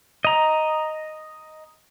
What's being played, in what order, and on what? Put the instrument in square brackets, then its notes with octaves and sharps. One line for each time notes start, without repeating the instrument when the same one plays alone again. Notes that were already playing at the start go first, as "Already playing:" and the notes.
[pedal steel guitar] D#5 A#5